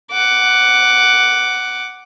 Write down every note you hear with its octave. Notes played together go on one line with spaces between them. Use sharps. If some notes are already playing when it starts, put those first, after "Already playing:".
F#5 D6